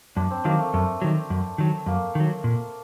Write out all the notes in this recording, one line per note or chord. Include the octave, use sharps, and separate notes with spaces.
F#2 D4
C4
D#3 F#3 A#3
A3
F#2 A3
D#3 F#3
F#2
D#3 F#3
F#2 A#3
D#3 F#3
A#2